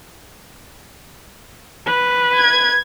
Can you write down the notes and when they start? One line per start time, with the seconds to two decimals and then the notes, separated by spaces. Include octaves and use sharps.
1.87 B4
2.38 G#6